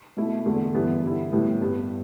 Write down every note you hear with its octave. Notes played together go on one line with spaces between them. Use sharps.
B2 A3 E4
E2 D3 A3
G2 E3 B3 E4
D3 G3 E4
A2 G3 B3 E4
G2 G3 B3